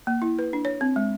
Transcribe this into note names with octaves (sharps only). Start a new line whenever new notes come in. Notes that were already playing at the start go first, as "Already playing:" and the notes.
A#3
E4
B4
D4
C#5
C4
G#3